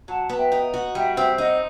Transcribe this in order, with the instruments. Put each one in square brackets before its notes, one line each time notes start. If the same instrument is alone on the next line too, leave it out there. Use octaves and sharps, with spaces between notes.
[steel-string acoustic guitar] F#3 [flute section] F#5 A5
[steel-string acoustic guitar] B3 [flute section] A5
[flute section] E5 G5
[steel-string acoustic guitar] D#4
F#4
[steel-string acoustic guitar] G3 [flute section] E5 G5
[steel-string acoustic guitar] C4 [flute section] E5 G5
[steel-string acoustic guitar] D#4 [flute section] D#5 F#5